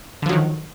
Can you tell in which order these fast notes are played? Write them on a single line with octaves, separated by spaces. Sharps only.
D3 F3 F#3 D#3